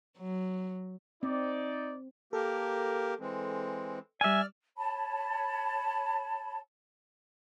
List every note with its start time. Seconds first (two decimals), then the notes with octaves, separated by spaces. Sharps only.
0.18 F#3
1.23 C4 D#4 D5
2.33 A#3 G4 A4 A#4
3.20 E3 G#3 C4
4.21 G3 D5 E5 G#5 E6 F6
4.77 C#5 A5 B5